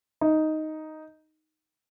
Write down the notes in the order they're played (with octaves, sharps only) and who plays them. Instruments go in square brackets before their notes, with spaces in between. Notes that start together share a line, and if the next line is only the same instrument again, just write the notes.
[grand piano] D#4